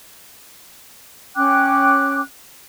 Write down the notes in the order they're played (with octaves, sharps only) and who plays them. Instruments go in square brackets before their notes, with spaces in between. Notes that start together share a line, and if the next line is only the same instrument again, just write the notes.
[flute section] C#4 G5 D6 F#6